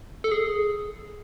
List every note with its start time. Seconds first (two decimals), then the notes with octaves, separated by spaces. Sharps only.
0.24 A4
0.31 G#4